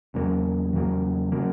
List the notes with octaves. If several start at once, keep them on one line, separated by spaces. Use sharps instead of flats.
E2 C#3 F#3 A#3
E2 C#3 F#3 A#3
C#3 F#3 A#3